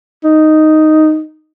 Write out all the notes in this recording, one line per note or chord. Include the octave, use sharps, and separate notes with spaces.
D#4